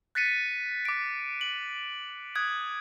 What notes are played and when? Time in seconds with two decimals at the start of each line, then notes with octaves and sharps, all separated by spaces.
0.15 F#6 A6 B6 C#7 D#7
0.85 D6 D7
1.41 F#7
2.36 D#6 F#6 G#6